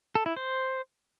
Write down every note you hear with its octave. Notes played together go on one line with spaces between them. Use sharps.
A4
E4
C5